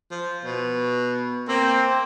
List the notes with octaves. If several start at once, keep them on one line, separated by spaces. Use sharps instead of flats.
F3
B2
A#3 C4